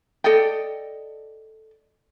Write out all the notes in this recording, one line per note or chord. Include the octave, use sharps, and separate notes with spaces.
A4 D5 D#5 G5